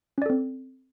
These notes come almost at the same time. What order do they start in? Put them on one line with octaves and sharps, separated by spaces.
C#4 D5 A4 C4